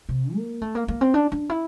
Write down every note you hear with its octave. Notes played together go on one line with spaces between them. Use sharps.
C3
A#3
A3
A#3
A#3
C4
D4
D4
E4